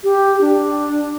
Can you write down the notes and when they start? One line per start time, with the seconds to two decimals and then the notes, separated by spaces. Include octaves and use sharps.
0.04 G4
0.41 D4